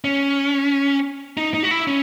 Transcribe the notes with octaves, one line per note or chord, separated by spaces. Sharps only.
C#4
D#4
D#4
F#4
E4
C#4